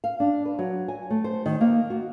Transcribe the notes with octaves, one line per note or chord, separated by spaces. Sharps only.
F5
D4
B4
F#3
G#5
A3
C5
D#3
A#3
F#4